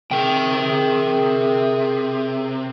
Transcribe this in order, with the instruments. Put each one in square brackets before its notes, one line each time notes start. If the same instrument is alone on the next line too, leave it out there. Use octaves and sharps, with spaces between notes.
[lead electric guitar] C3 [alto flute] G#4 [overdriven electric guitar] A#4 G5